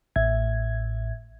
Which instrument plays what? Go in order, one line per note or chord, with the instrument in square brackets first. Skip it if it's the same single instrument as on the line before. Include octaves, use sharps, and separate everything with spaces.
[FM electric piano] A1 A2 E5 G#6